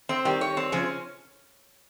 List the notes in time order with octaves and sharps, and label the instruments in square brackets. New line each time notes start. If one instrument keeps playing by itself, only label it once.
[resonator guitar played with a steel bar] C4
[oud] D#3 G3 [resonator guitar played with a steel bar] G4
[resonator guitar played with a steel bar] C#5
C4
[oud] C#3 F3 [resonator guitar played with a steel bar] C#4